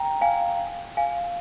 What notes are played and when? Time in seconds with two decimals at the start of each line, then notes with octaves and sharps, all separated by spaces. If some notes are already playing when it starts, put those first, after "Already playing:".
Already playing: G5 A#5
0.21 F5 G#5
0.97 F5 G#5